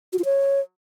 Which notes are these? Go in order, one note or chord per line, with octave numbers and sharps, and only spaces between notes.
F#4
F4
C#5